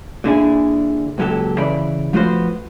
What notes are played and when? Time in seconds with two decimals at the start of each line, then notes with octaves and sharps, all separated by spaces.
0.24 A#2 D3 E4 G#4
1.18 C#2 A#2 F#3 G4 A4
1.58 C#3 E3 D5 B5
2.13 F3 A3 B3 F4 F#4 C5